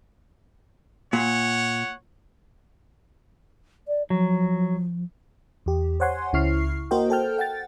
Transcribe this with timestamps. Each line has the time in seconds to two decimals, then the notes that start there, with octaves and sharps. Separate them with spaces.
1.13 A#2 C#5 F#5
3.88 D5
4.10 F3 F#3
5.66 E2 G4
6.00 C5 C#5 F#5 G#5 C6
6.33 C#2 C#3 E4 C#6 F6 C7
6.91 A#3 F#4 A#4 C5 D#5 G5
7.10 A4 C5 G5 A5 F6 G6
7.39 F#5 G5 A6